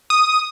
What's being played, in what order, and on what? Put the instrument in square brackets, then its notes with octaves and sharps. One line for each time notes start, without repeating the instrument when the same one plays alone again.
[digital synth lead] D#6